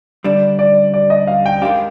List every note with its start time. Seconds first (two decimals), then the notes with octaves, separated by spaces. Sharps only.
0.24 D3 G3 D4 D5
0.59 D5
0.94 D5
1.10 D#5
1.27 F5
1.46 G5
1.62 D#3 G#3 D4 G4 F5